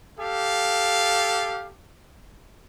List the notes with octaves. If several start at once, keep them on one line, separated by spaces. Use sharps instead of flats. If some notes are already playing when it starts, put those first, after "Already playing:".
G4 A4 F5